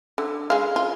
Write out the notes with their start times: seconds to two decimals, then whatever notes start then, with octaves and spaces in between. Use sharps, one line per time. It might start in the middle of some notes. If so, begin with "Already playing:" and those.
0.18 D3
0.50 G#3 F5
0.76 F4